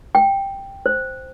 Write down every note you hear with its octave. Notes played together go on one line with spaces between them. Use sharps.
G5
C5